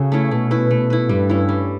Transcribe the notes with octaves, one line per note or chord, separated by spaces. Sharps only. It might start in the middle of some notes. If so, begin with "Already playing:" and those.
Already playing: C#3 F#4 A4
A3 C#4 E4
B2 A3
E4 B4
A3
E4 B4
G2 G3
C#4 E4
G3